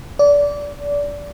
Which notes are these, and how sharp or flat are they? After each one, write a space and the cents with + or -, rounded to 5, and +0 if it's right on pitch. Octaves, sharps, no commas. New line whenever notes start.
D5 -25